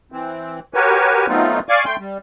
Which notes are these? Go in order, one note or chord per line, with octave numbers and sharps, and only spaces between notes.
E3 C4
F#4 G4 A#4 B4 C#5 G#5
F#3 A3 B3 C4 D#4 F4
D5 F5 G#5 C#6 D6
A3 G5 C6
G3